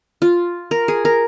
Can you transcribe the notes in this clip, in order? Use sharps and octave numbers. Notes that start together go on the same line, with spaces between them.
F4
A#4
G#4
A#4